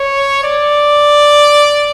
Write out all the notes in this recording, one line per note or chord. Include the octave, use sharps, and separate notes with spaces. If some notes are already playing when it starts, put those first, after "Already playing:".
Already playing: C#5
D5